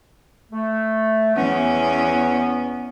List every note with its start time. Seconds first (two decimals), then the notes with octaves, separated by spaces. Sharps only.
0.51 A3
1.36 E2 B3 C#4